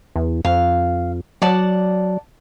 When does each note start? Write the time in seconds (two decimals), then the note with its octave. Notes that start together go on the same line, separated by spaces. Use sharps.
0.16 E2
0.45 F2 F5
1.42 F#3 D5 F#5 A5